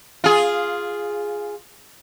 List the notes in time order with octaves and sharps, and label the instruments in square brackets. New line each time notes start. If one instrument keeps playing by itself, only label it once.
[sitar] F4 G#4